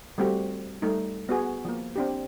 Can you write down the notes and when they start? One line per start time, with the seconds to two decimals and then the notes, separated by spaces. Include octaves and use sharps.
0.18 G3 A3 C4 F#4 G4
0.82 G3 A3 D#4
1.29 B3 F#4 G#4
1.65 F3 A#3
1.96 C4 D4 G4